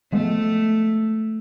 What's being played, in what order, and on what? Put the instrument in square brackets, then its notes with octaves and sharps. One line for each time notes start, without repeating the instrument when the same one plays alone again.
[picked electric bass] F3 G#3 B3 [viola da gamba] A3